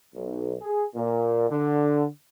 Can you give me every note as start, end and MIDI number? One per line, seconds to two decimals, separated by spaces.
0.15 0.55 35
0.61 0.88 68
0.95 1.47 46
1.50 2.05 50